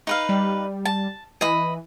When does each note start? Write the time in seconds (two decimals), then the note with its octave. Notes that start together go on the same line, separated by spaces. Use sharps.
0.07 D#4 B4 F5
0.29 G3
0.85 A5
1.41 E3 D#5 B5